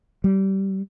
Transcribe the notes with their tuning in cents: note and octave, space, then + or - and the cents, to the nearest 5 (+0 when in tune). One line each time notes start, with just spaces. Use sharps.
G3 -20